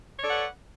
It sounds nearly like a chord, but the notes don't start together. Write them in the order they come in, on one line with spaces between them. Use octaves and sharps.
C#5 D5 A4 F#5 B4